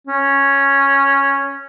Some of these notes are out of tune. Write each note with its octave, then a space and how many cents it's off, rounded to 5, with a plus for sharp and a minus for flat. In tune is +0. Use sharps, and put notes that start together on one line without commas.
C#4 -5